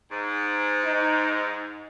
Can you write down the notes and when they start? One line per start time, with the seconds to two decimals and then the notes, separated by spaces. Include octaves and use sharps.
0.11 G#2
0.86 D#4